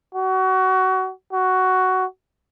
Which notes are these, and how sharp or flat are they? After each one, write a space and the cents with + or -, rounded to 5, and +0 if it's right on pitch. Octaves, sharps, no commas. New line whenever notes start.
F#4 +25
F#4 +10